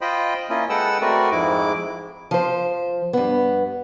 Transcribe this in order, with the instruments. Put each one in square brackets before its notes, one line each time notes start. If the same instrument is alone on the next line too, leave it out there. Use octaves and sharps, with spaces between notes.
[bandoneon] F4 C5 D#5 G5 B5
A#3 C#4 E4 F4 D#5
G#3 A4 B4 F#5 G5 E6
A3 C4 F#4 A#4 B4 D5
F2 G#2 G#3 E4 D6
[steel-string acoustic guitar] F3 C5
G2 B3